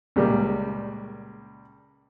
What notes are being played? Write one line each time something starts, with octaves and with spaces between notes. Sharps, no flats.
C#2 A#2 C#3 G3